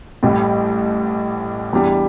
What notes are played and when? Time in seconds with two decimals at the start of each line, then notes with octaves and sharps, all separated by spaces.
0.23 A1 A2 G3
1.73 E2 E3 G3 D4